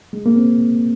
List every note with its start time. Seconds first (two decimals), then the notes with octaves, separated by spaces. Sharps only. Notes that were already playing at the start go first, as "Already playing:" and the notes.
0.13 G#3
0.26 A#3
0.36 C4